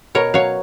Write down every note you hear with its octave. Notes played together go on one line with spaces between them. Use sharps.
B2 A#4 C#5
F#3 C#5 F5